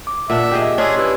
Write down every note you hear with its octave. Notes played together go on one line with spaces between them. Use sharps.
D6
A#2 D4 E5 F#5
G4 G#4 D#5
C#4 D4 G#4 C#5 C6 E6
E4 G4 B4